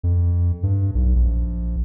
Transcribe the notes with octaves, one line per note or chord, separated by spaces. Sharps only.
F2
G2
B1
A#1